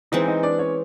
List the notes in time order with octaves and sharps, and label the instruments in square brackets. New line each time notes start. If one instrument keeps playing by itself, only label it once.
[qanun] E3 G#3 C4 [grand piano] D#4 D#5
[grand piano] D#4 D#5
D4 D5
C#4 C#5